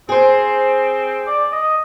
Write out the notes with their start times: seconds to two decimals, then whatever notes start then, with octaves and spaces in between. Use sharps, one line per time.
0.09 C4 G#4 C5
1.27 D5
1.52 D#5